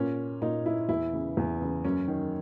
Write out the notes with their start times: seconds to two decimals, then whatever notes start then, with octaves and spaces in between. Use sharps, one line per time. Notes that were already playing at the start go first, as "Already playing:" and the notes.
Already playing: A#2 C#4
0.42 A#2 D#4
0.66 E4
0.89 E2 E4
1.13 C#3 E3
1.37 E2
1.61 C#3 E3
1.85 F#2 C#4
2.08 D#3